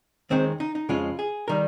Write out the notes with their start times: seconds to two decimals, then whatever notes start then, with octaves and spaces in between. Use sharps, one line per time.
0.30 D#2 D#3 G#3 C4
0.60 D#4
0.75 D#4
0.89 F2 C#3 G#3 F4
1.19 G#4
1.48 D#3 G3 A#4